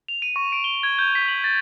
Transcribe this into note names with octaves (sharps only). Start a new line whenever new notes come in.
F7
D#7
C#6
D7
G7
G#6
G6
B6
F#7
A6